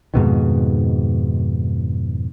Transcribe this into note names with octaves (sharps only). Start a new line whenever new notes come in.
F2 G#2 B2 D#3